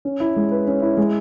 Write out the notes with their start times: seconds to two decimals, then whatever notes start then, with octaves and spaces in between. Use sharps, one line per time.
0.05 C#4
0.20 E4
0.36 G#3
0.51 B4
0.67 C#4
0.82 E4
0.97 G#3